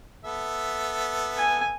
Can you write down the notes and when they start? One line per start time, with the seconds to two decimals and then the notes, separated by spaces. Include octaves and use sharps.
0.24 B3 A4 E5
1.38 G#5